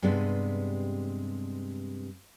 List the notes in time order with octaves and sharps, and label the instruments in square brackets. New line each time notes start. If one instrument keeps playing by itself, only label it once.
[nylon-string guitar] G2 C3 G#3 B3 D4